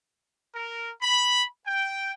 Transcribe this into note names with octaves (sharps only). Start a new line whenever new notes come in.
A#4
B5
G5